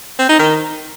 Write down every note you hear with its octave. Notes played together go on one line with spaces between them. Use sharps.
C4
D#4
D#3